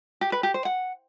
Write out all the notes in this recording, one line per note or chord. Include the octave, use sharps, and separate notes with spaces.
G4
B4
G4
C5
F#5